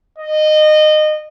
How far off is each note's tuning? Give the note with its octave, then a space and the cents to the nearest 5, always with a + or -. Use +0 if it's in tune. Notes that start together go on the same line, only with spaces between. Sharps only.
D#5 -20